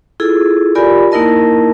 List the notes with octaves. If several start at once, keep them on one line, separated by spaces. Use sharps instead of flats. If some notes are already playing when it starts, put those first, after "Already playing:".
E4 F4 G#4 A4
F4 G4 A#4 D5 G#5 B5
A#3 D#4 E4 A#4 D#5 A5